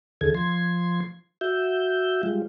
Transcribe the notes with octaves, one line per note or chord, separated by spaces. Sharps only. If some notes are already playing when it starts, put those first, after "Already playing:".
D#2 D3 E3 G#4 A4 G#6
F3 C6 G#6
F#4 E5 G6
G3 G#3 F4